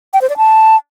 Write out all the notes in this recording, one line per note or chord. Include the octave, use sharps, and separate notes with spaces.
G5
C5
D5
A5